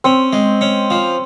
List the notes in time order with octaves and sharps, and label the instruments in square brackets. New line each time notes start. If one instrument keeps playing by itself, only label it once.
[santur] C4 [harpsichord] C#4
[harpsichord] G#3
C#4
F3